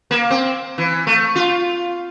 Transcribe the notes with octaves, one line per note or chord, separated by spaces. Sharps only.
A#3
C4
E3
A3
F4